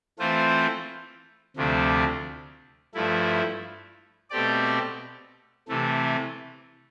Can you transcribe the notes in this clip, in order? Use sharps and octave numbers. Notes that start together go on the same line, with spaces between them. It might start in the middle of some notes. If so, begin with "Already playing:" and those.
E3 A3 C4 F4 C5
D2 C3 F3 A3 D4
G2 F3 A3 E4
B2 A3 C4 G4 D5
C3 E3 A3